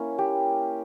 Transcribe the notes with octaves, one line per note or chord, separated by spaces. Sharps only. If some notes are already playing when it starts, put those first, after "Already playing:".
Already playing: A#3 C#4 E4
G4